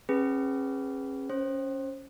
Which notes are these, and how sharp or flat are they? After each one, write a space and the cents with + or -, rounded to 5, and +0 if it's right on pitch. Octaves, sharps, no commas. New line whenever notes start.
C#4 -40 G#4 -20 B4 +0
C#4 +0 C5 +25